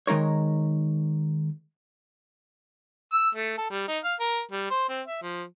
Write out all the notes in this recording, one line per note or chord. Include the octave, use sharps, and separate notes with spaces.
D#3 G#3 D#4 A#4 C#5
E6
A3
A4
G3
D#4
F5
A#4
G3
C5
C4
E5
F3